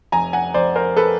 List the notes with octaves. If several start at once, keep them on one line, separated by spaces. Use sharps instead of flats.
F1 G#5 A#5
F#5 G#5
F1 C5 D5
A#4 C5
A4 B4